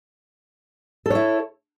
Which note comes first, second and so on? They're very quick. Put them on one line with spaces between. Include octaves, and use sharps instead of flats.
A4 C#5 E4